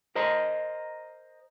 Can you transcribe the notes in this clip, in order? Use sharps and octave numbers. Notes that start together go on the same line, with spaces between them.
A#4 C5 D#5 A#5